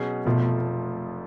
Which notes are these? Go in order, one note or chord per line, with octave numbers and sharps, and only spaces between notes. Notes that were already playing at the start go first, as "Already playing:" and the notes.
Already playing: B2 F#3 C#4 G#4
F1 F2 B2 F3 A3 F4